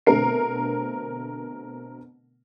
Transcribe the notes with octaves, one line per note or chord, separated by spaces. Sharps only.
B2 D3 A3 C4 A#4 C7